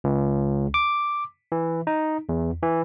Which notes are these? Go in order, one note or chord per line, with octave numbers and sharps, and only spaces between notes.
C#2
D6
E3
D#4
E2
E3